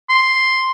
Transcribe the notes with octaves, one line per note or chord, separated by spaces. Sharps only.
C6